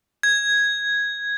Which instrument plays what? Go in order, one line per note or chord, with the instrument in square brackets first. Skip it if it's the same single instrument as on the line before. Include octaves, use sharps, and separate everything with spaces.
[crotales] G#6